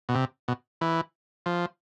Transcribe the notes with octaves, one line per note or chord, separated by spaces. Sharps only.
B2
C3
B2
E3
F3